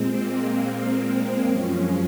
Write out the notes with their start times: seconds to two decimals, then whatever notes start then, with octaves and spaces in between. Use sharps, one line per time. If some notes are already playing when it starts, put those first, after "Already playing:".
Already playing: A#2 G#3 C4
0.13 A#3
0.56 A#3
0.98 C4
1.41 F#2 F3 G#3 C#4